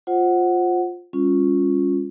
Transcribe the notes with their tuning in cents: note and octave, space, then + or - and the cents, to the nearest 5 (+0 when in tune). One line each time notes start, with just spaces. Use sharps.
F4 +10 C5 +15 F#5 +0
G3 +35 C#4 +0 F4 +10